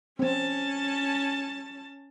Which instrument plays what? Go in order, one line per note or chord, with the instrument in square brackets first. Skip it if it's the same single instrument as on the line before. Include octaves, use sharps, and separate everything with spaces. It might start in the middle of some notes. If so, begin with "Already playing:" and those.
[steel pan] C4 [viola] C#4 A5